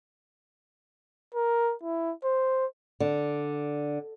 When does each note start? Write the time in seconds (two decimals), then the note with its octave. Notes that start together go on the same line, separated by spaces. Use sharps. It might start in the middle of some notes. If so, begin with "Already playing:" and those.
1.35 A#4
1.83 E4
2.24 C5
3.00 D3